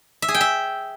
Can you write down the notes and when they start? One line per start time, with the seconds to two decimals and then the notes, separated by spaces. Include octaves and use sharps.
0.22 E5
0.28 G#4
0.35 G5
0.41 E5